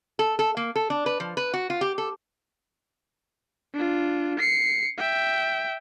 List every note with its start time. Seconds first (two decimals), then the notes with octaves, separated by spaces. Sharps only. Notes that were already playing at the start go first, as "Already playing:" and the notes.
0.19 A4
0.39 A4
0.57 A#3
0.76 A4
0.90 D4
1.06 B4
1.20 F3
1.37 B4
1.54 F#4
1.70 F4
1.81 G4
1.98 A4
3.74 D4 F4
4.39 C7 C#7
4.98 E5 G5